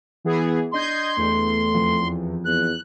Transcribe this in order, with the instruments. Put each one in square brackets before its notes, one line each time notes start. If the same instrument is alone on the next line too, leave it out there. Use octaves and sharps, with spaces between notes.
[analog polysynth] E3 B3 G#4
[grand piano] D4 [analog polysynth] D#5 G6 G#6 [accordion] C6
[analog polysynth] E2 [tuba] A3
[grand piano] F2
[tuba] E2 [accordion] F#6